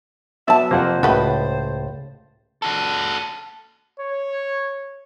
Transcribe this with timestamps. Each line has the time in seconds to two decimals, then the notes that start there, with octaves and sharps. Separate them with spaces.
0.48 F#3 B3 D5 E5 A5
0.71 F2 C3 A#3 F4 C5 F#5
1.03 C#2 A2 C#3 F#4 B4 D#5 A6
2.62 F#4 A4
4.00 C#5